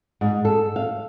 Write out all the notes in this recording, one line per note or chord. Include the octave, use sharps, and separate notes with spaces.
G#2
A4
F5